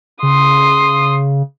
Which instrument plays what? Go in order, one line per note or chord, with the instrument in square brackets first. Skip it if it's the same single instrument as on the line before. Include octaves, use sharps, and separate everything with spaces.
[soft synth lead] C#3 [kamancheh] C6 D#6